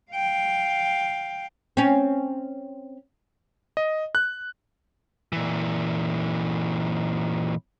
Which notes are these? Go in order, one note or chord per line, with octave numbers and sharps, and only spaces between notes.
F5 G5
C4 C#4
D#5
F#6
A#2 E3